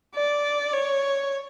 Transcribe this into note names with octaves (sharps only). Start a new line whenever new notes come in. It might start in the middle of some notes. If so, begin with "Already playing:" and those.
D5
C#5